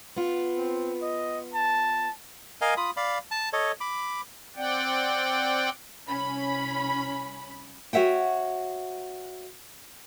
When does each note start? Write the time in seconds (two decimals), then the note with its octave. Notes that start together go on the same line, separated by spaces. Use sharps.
0.17 B3 F4
0.57 C4
1.02 D#5
1.54 A5
2.61 A#4 D#5 F5 G#5
2.77 F4 B5 D#6
2.97 D5 F5 B5
3.31 A5
3.53 A4 C#5 D#5
3.81 B5 D6
4.56 C4 D5 F#5 G5
6.08 C2 C#4 B5
7.93 F#4 C#5 E5 F#5 G5